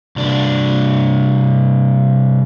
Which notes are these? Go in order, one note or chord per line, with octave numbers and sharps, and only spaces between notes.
C2 D4